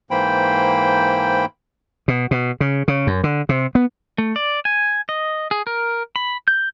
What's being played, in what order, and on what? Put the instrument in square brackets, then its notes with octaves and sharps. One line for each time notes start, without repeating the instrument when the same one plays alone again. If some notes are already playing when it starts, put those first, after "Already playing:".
[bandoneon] G#2 E3 A#3 C5 G5 B5
[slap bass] B2
B2
C#3
C#3
F#2
D3
C3
B3
[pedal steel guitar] A3
D5
G#5
D#5
G#4
A#4
B5
G6